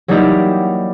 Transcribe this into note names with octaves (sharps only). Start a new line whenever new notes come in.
F#3 G3 A#3 D#4 E4 G4